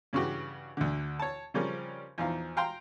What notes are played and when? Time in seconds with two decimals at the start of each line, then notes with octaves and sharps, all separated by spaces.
0.13 G2 C#3 E3 F#4 G4
0.77 D2 D3
1.19 C#5 A5
1.54 C#3 F3 G3 C4 C#4 A#4
2.18 E2 F3 D#4 F5
2.57 F5 G5 A#5 C6